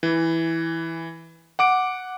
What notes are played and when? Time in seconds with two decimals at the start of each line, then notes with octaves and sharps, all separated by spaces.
0.03 E3
1.59 F#5 D6 D7